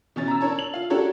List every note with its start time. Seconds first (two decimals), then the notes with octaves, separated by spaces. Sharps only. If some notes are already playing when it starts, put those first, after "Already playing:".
0.16 B2 E3 C#4 A6
0.28 A#5 E6
0.41 D4 A#4 C#5 A5
0.59 F#7
0.74 F4 F5
0.90 D4 F#4 G4 A4 A#4 C#5